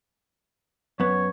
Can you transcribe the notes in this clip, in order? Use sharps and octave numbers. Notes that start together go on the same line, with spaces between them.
F#2 B3 C#5